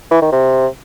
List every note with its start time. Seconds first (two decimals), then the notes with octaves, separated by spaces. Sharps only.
0.11 E3
0.22 D#3
0.32 C3